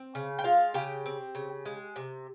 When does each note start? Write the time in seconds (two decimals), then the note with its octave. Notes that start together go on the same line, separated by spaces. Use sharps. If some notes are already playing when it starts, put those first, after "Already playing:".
Already playing: C4
0.15 C#3
0.39 G5
0.44 G#3 F4 F5
0.74 C#3 G4 G5
1.06 C4
1.35 C#3
1.66 G#3
1.96 C3